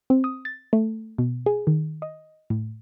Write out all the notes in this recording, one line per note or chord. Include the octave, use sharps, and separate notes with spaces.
C4
D#6
A6
A3
B2
G#4
D#3
D#5
A2